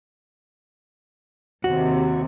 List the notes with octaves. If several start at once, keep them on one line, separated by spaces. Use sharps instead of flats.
D#2 C3 F#4